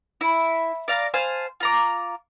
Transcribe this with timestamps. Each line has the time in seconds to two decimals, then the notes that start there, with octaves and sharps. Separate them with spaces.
0.21 E4
0.88 D5 F5 A#5
1.14 C5 F5 G#5 A5
1.60 F4 A#5 D6